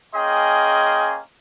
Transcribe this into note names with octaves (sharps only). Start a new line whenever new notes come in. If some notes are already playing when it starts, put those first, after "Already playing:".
A#3 C#4 G#4 D#5 G5 C6